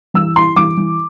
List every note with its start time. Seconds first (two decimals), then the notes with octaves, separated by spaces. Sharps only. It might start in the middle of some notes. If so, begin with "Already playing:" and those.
0.14 E3 E6
0.36 E4 C6
0.56 E3 D6
0.77 E3